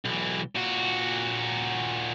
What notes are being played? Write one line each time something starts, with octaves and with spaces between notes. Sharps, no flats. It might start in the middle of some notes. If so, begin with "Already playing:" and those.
B1 E3
A#2 F#4